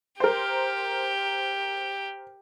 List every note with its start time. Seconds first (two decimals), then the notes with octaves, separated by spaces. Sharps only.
0.20 G4 A#4 C5